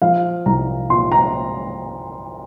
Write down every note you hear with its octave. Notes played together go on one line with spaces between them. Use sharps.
F3 F5
C2 A#5
A#2 C6
A#5